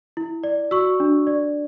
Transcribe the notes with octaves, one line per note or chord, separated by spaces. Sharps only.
E4
D5
F#4 C#6 E6
D4
D5